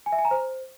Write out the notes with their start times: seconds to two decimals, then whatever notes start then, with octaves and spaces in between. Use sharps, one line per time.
0.06 G#5
0.12 E5
0.19 G#5
0.25 A#5
0.31 C5